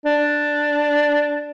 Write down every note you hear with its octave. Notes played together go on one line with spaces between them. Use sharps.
D4